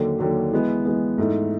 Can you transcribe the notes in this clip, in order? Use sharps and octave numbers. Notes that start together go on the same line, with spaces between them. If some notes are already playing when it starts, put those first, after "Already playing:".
Already playing: D#2 D3 F#3
D#2 D3 F#3
E3 G#3 B3
E3 G#3 B3
G#2 E3 A3